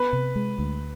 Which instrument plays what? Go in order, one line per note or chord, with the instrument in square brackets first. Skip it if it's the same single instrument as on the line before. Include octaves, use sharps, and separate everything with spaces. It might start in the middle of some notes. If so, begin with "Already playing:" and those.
Already playing: [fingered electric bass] B3 [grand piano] B4
[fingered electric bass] C3
G#3
D2